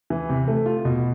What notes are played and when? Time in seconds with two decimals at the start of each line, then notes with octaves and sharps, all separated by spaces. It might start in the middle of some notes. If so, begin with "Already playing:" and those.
0.10 E3
0.29 C3
0.48 A3
0.66 F4
0.85 B2